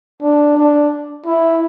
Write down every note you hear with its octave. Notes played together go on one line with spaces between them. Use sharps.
D4
D4
E4